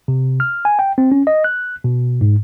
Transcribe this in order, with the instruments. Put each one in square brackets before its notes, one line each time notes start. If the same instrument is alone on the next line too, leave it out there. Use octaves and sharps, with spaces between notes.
[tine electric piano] C3
F6
G#5
G5
C4
C#4
D#5
F#6
B2
G#2